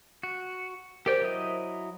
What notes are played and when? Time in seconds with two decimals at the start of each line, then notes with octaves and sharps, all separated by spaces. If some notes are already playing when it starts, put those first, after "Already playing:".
0.23 F#4
1.06 G4 A#4 C5 D5 G5
1.21 F#3 E4 D#5